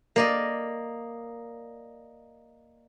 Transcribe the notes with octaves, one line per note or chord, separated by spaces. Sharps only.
A#3 D5 D#5